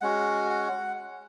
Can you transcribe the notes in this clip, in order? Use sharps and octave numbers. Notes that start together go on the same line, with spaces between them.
G#3 C#4 F#4 F#5
F#5